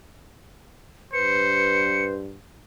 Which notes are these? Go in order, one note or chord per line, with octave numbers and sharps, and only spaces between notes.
G2 B4 C5 C#7